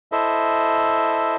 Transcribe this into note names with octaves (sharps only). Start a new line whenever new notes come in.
E4 A4 C5 D#5 E5